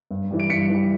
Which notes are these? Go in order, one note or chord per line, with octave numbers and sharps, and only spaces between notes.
G2
E3 G3
D7
G2 B6 C#7
E3 G3